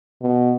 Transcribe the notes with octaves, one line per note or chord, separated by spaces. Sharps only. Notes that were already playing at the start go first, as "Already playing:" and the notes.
B2